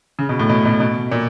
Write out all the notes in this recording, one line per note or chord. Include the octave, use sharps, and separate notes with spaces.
C#3
B2
A2
B2
B2
B2
A#2